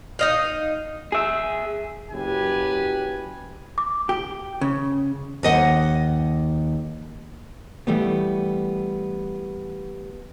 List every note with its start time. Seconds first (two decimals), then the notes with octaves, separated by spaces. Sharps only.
0.19 D#4 D#5 F5
1.12 G#4 E5
2.12 F#1 F#3 G4 B4 G#5
3.78 D6
4.09 G4
4.61 C#3
5.43 D#2 D#5 F#5
7.87 E3 G3 A3 B3